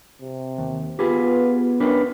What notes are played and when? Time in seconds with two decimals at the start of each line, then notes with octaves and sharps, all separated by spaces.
0.21 C3
0.58 D#2
0.99 B3 F4 G4 G#4 B4
1.80 F#2 D4 A#4 B4